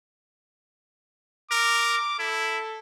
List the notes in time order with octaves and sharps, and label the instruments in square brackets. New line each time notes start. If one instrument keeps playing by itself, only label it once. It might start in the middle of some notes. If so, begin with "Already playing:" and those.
[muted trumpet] A#4 [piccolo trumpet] D6
[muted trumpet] E4 [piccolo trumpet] A4